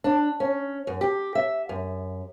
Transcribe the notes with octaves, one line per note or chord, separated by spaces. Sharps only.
D4
C#4
F#2
G4
E5
F#2